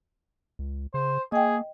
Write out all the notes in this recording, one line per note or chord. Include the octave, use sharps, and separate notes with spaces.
C#2
C#3 C5
A#3 G#4 D#5 G5